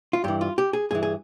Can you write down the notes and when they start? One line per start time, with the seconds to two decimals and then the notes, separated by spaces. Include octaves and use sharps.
0.13 F4
0.24 G2 E3 G4
0.41 F4
0.58 G4
0.73 G#4
0.91 G2 E3 G#4
1.03 G#4